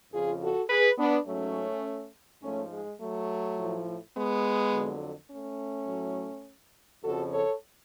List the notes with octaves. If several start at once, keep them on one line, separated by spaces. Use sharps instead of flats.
F2 C#3 F3 F4 G#4
F#4 A4
G#4 B4
B3 D4
G#2 F#3 A3 C#4
G#2 F3 A3 C#4
G#3
F#3 A3
A2 F3
G#3 B3
F2 D3 F#3
A3 C#4
A2 F#3
F2 C#3 F3 F#4 A4
A4 C#5